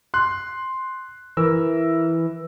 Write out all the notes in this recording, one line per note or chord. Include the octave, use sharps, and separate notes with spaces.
C6 F#6
E3 A#4 E6